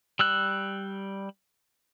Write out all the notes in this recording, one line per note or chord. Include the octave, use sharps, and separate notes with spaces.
G3 E6 F#6